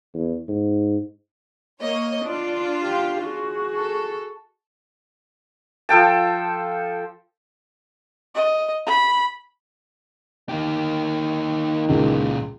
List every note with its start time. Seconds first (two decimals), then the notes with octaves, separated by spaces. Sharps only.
0.14 E2
0.48 G#2
1.82 A#3 C#5 D#5
2.24 D4 F4 D5
2.84 G4 F5
3.23 F#4 G#4
3.76 A4
5.89 F3 A4 G5 A5
8.35 D#5
8.86 B5
10.49 D#3 A#3 G4
11.89 C#2 A#2 E3